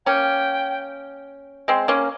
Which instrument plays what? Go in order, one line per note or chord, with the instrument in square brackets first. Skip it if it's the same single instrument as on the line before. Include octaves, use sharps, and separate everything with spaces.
[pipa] A#3 C#4 [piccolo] G5
[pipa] G#3 C4
A#3 C#4